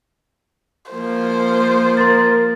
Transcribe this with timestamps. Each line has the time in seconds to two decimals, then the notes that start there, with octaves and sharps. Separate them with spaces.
0.92 F3 A#3 C5
1.97 A#4 C6 A6